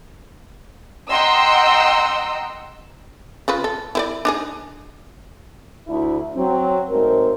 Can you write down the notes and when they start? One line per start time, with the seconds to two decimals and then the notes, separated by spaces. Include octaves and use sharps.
1.10 D#5 F#5 G5 A#5 C6 E6
3.48 C#3 F4 B4
3.64 A4
3.95 E4 B4 D5
4.25 D4 D#4 G#4
5.87 D2 E4
6.35 F#3 C4
6.89 G#2 F#3 A3 C4 A#4